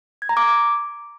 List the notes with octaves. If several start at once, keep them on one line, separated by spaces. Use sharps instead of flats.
G#6
A#5
D6